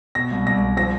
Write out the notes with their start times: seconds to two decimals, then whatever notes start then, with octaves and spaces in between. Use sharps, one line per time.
0.15 B2 A#6
0.31 C2
0.46 C2 A#6
0.62 C2
0.77 F3 A#6